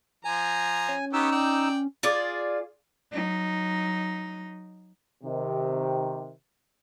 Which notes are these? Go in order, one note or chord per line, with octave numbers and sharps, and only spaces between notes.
F3 G#5 A#5
C#4
B3 D#4 G4 C#5 E6
D5 G5
F4 G#4 D5
F#3 D#4
C3 D#3